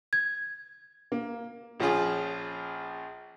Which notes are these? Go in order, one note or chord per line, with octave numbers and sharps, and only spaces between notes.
G#6
A#3
A#1 F3 C#4 F4 G#4